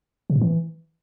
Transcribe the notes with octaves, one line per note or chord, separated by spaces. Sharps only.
C3
A2
E3